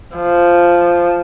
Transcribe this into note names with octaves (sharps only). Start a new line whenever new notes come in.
F3